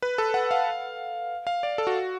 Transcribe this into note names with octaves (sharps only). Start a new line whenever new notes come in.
B4
A4
F#5
F5
F5
D5
A4
F#4